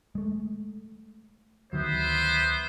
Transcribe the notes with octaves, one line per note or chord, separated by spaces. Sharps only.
G#3 A3
D2 D#3 F#3 B3 C5 E5